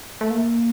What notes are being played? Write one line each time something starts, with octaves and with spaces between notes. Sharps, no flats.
A3
A#3